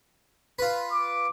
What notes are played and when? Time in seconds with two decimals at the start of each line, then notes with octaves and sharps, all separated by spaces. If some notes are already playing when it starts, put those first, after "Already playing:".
0.59 F4 B4
0.92 D6